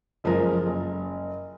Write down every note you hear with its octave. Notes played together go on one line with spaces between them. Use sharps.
F#1 F3 G#3 A#4
F#1